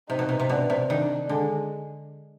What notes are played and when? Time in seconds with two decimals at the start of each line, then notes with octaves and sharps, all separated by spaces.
0.09 C3 D#4
0.19 B2
0.29 C3
0.40 C3
0.49 B2 D4
0.70 C3
0.89 D#3 D4
1.29 D3 G#3